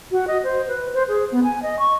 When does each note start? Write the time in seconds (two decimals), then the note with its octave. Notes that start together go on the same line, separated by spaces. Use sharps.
0.11 F#4
0.27 D#5
0.44 C5
0.68 B4
0.94 C5
1.09 G#4
1.32 B3
1.43 G#5
1.63 D#5
1.79 C#6